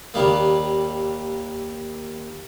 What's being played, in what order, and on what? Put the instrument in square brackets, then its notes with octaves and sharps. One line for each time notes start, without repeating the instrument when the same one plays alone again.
[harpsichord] D#2 D#3 G3 A#3